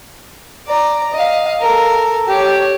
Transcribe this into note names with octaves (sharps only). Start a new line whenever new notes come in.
D5 A#5
D#5 F5
A4 A#4
G4 C#5